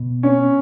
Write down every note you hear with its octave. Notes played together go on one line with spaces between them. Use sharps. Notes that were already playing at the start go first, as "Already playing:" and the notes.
Already playing: B2
C#4